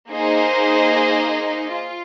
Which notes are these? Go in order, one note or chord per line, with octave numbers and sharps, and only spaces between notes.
A#3 D#4 G#4 C5 D#5
F4